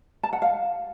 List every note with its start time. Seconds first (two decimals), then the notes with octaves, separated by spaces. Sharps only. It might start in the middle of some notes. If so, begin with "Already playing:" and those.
0.23 A5
0.33 F#5
0.42 F5